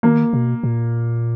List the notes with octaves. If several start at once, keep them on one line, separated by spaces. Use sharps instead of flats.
D#3 A#3
B2
A#2